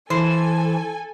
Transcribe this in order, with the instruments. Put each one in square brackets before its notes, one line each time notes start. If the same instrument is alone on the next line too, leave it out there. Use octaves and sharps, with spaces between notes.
[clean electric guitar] E3 [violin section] A4 G#5 [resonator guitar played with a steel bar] C5